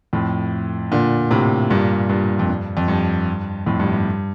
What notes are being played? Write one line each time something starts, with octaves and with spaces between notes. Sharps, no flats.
F2 A2
A#2 D3
A2 C3
G2 A#2
G2 A#2
F2
G2
F2
G2
F2 A2
G2
G2